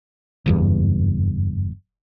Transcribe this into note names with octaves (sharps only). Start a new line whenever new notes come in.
F#1 E2 G2